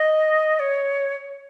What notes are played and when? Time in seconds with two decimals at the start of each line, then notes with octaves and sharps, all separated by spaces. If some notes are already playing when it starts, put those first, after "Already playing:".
Already playing: D#5
0.59 C#5